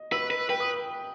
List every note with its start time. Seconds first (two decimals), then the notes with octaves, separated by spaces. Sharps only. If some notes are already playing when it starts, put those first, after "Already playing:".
Already playing: D#5
0.12 B4 E6
0.31 B4
0.49 B4 G5
0.60 D#6